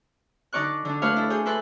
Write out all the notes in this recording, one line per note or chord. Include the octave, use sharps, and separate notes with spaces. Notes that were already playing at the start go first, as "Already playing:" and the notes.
D3 D#4 D5 C#6 F#6
D3 D4
A3 D4 B4 C#5 F5
E4 A4
G#4 C#5 G6
E4 A4 B4 B5 C6